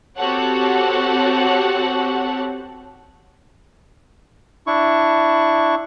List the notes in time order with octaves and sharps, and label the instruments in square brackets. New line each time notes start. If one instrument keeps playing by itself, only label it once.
[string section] C4 F#4 G4 A4 C#5 F#5
[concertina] D4 E4 C#6